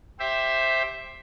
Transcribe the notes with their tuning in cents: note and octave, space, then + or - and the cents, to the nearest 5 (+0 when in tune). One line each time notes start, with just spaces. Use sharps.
G4 +0 C5 +10 E5 +0